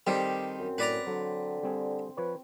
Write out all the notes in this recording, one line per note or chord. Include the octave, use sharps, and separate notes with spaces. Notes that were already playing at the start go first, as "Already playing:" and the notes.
D#3 G3 C4 G4 A4 D#5
F#2
A2 B4 D5 A#5
D3 F#3
G3 C4 G#4
F3 B4 C#5